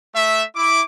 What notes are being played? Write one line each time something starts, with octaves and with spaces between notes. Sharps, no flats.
A3 E5
E4 D6